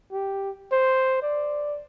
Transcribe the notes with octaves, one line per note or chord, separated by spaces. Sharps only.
G4
C5
D5